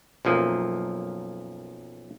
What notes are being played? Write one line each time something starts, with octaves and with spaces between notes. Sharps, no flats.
B1 F#2 F3 A#3